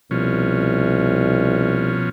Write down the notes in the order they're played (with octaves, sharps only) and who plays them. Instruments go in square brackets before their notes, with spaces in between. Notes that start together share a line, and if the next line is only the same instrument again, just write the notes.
[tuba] C2 [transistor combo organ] B2 F3 C#4